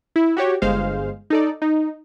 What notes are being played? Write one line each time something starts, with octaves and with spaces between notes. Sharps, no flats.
E4
F#4 G4 C#5
G1 G#3 C5 F5
D#4 A4 D5
D#4